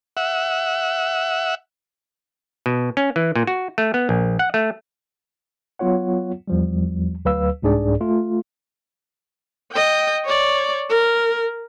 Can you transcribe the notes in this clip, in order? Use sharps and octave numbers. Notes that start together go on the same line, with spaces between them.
E5 F#5
B2
C#4
E3
A#2
F#4
A3
B3
A#1
F#5
A3
F#3 B3 F4 C#5 F#5
E2 F3 G3
D2 F#3 B4 F5 E6
C2 G#2 D4 G#4 D5
A3 F4
D#5 G5
C#5 D5
A#4